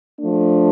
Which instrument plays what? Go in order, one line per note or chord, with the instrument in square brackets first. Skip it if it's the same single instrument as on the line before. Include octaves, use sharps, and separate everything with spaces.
[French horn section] F3 A3 D4